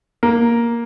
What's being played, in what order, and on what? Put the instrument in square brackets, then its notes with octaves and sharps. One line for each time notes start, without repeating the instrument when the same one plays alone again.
[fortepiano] A#3